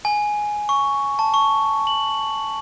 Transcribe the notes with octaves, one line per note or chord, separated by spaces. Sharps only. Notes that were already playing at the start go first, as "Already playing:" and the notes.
G#5
C#6
A5
C#6
F#7